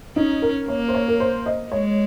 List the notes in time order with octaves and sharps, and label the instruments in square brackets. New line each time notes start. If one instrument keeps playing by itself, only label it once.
[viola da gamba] C#4 [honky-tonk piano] D#4
[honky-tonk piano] A#4
[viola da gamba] A#3 [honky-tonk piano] C#5
[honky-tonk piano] C5
C#5
A#4
C5
D#5
[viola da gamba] G#3 [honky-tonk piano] C#5